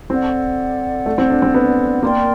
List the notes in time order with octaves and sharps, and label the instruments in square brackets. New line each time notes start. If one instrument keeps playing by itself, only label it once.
[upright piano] C4 [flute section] A4 D5 F#5
[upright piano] A3
C4
D4
C4
B3
[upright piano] A#3 [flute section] A#4 D5 G5 C6